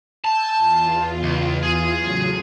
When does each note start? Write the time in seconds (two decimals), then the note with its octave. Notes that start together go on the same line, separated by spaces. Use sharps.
0.24 G#5 A5 E6 G6
0.56 E2 F4
1.23 C#2
1.63 G#4
1.96 A2 C#3 F#3